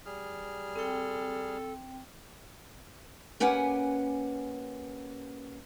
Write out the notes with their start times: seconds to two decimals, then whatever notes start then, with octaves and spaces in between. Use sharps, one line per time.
0.06 G3 G#4 F6
0.76 C4 A4 G5
3.40 A#3 C#4 G4 B4 F#5 G#5